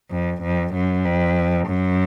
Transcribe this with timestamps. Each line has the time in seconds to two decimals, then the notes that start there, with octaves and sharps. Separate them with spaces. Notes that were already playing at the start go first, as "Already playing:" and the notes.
0.11 F2
0.42 F2
0.74 F#2
1.05 F2
1.67 F#2